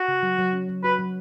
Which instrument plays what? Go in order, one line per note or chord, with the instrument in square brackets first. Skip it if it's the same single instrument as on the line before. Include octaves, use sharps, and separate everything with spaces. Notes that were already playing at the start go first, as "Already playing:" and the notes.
Already playing: [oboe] F#4
[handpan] C#3
F#3
F#3
C#4
F#3
[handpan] F#4 [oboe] B4
[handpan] F#3